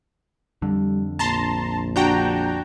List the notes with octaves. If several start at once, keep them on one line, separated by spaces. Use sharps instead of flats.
F2 D3 G3
A#1 A5 A#5 C6
D4 F#4 G5 A#5 G6